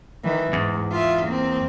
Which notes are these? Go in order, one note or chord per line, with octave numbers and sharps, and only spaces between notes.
D#3 E3
E2 G#2
F4 E5
A#3 C4